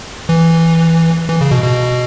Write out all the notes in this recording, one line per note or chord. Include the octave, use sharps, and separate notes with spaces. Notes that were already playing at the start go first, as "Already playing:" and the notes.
E3
E3
C#3
B2
B2